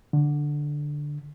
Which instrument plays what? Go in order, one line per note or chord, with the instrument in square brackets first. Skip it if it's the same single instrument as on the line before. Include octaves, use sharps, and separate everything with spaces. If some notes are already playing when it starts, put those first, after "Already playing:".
[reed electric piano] D3